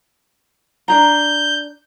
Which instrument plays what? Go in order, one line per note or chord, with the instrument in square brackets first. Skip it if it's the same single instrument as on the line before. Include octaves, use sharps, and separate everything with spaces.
[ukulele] D4 G#4 A#5 [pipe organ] G6